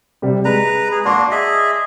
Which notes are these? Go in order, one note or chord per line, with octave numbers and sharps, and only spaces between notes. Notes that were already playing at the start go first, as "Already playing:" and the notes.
C3 G3
G#3 B4 A#5
G#4
A#3 D4 F#4 D5 C6 D6
G#4 D#5 E5